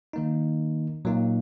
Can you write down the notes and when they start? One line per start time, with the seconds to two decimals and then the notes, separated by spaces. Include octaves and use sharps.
0.13 D#3 A#3 D#4
1.05 A#2 F#3 A#3 D#4